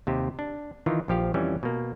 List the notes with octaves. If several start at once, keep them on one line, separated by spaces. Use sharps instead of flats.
D#2 C3 G4
D4
D#3 E3 D#4 F4
A#1 F3 G4 F5
F2 E3 G3 C#4
B2 A#3